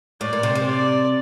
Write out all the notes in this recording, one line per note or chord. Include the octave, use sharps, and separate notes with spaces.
A2 D5
A#2
C3
C3
D5